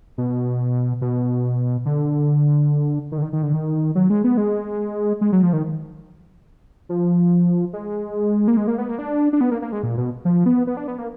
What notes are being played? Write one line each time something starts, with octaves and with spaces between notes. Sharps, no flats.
B2
B2
D3
D#3
D3
D#3
D#3
D3
D#3
F#3
G#3
B3
G#3
G#3
F#3
F3
D#3
F3
G#3
A#3
G#3
A#3
B3
A#3
D4
D4
B3
A#3
A#3
G#3
A#2
B2
F3
B3
B3
D4
B3
A#3